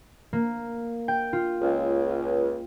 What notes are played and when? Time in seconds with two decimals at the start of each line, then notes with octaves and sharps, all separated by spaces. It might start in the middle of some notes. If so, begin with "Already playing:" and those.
0.33 A#3
1.08 G5
1.33 F4
1.61 C#2